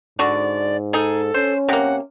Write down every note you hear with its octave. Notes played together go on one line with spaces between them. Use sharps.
G#2 D3 F#4 D5
D#4 G#4 A4
C#4 C5
C3 A#3 F#5